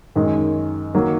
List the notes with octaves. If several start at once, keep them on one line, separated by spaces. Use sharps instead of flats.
F#2 D#3 G#3
D#3 F#3 A#3